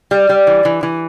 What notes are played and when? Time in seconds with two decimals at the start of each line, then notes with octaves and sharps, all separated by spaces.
0.11 G3
0.29 G3
0.47 E3
0.65 E3
0.83 E3